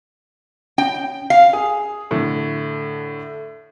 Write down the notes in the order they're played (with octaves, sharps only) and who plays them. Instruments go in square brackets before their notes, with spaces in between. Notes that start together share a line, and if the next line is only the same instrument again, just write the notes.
[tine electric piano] C#4 [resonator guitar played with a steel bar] G5
[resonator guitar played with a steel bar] F5
[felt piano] G#4
A2 D3